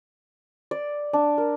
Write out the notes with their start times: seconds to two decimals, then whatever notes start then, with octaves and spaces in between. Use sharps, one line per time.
0.71 D5
1.13 D4
1.38 A#4